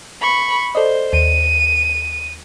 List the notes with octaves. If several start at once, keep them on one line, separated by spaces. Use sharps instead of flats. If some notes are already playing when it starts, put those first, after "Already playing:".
B5 C#6
A4 C5 D5 D#5
D#2 D#7